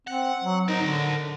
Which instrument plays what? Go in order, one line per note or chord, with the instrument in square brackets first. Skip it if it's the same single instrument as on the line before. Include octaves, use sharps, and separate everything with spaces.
[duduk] C4 [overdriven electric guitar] F#5
[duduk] F#3
[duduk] D#4 [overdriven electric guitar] A#4 C5
[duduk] D3